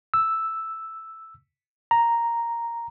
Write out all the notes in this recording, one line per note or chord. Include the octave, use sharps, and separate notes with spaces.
E6
A#5